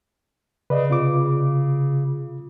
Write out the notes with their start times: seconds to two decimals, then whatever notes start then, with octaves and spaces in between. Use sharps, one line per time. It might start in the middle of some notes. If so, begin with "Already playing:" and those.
0.70 C#3 B4 D5 D#5
0.90 C3 F4 D6